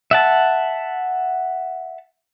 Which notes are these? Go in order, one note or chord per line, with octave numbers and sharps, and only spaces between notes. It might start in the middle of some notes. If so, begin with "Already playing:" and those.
E5 F#5 A5